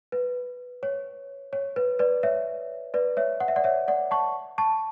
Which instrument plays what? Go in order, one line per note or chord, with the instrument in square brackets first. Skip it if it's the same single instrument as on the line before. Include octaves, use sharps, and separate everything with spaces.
[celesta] B4
C#5
C#5
B4
B4 D5
C#5 E5
B4 D5
C#5 E5
F#5
E5
D5 F#5
C#5 E5
D5 F#5
A5 C#6
A5 C#6